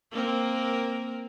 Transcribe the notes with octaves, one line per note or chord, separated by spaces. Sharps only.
A#3 C4 A#4